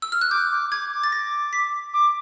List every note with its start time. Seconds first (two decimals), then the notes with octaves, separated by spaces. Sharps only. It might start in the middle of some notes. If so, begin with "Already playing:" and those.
0.02 E6
0.12 F6
0.21 F#6
0.31 D6 G6
0.52 D6
0.71 D6 G#6
0.92 D6
1.04 A6
1.12 A#6
1.53 B6
1.94 D6